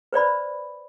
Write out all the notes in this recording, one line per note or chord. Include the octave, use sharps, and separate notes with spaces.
B4 C5 D5 B5